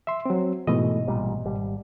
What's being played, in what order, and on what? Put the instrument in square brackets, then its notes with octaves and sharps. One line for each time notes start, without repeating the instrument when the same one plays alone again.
[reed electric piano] E5 C6
F#3 C4
[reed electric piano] G#2 B2 D#5 [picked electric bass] E3 A3
[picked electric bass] A1 A#2 G3
G#1 G3